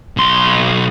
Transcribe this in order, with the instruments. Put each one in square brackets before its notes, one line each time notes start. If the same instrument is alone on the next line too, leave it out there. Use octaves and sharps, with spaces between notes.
[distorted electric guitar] B1 C6